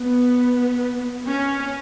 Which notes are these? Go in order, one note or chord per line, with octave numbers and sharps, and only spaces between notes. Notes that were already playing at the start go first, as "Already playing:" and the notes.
Already playing: B3
C#4